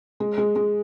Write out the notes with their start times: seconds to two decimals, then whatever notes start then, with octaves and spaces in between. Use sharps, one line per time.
0.20 G#3
0.38 G#3
0.56 G#3